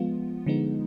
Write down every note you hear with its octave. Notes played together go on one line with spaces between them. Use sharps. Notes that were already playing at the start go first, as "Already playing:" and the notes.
Already playing: F3 G#3 B3 F4
D3 F3 G#3 B3 D#4